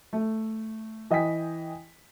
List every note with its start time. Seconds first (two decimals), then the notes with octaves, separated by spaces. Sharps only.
0.13 A3
1.11 E3 D#5 G5 G#5 B6